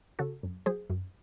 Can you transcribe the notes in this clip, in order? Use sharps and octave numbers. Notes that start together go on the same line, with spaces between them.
C#3 F#4 A4
F#2
F#3 G#4 C5
F#2